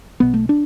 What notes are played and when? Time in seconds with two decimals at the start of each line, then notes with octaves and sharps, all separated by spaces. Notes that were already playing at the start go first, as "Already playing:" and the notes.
0.20 B1 B2 B3
0.34 A3
0.49 D4